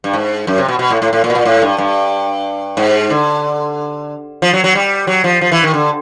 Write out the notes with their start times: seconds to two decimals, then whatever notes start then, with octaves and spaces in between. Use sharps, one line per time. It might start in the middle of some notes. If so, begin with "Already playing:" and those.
0.04 G2
0.14 G#2
0.47 F#2
0.58 C3
0.68 B2
0.79 B2
0.90 A2
1.02 A2
1.13 A2
1.24 A#2
1.30 B2
1.35 A#2
1.45 A2
1.62 G2
1.78 G2
2.77 G#2
3.10 D3
4.42 F3
4.53 F#3
4.64 F#3
4.75 G3
5.07 F#3
5.24 F3
5.41 F3
5.52 E3
5.63 D#3
5.74 D3